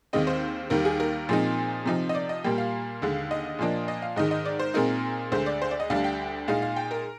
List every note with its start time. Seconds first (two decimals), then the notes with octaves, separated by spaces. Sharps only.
0.13 D#2 D#3 G#3 C4 D#5
0.27 C5
0.70 D#2 D#3 G3 A#4
0.85 G#4
1.00 A#4
1.29 A#2 F3 G#3 C4 D#4
1.85 C3 F3 C4 D#4
2.09 D#5
2.15 D5
2.29 D#5
2.44 A#2 G3 A#3 G5
2.58 F5
3.02 D#2 D3 G#3
3.31 D#5
3.59 A#2 F3 A#3 D4
3.88 D#5
4.02 F5
4.16 G#2 D#3 G#3 D#5
4.31 D#5
4.45 D5
4.60 C5
4.74 A#2 G#3 C4 D#4 A#4
5.32 D2 D3 G#3 C5
5.46 D5
5.62 C5
5.71 D5
5.80 D#5
5.90 D2 D3 G3 D4 F5
6.04 G5
6.48 A#2 G#3 D#4 F5
6.62 F5
6.76 G5
6.91 A#4